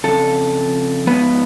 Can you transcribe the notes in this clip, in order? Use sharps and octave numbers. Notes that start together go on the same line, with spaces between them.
F2 C#3 A4
G#2 F3 B3 B4